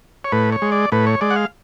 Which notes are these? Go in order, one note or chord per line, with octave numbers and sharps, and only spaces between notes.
C#5
A2 B4
C#5
G#3
D5
A2 B4
C#5
G#3 D5
F#5
F5